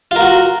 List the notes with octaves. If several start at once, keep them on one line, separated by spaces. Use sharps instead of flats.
F4 F#4 A#4